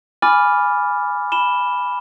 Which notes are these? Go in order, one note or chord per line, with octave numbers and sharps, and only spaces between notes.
G#5 B5 D6 F6 A6
B5 E7 G7